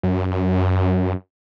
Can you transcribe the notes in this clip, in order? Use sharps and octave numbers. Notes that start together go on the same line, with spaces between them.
F#2